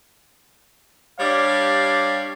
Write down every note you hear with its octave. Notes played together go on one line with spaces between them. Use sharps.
G3 D4 G4 C#5 D5 F5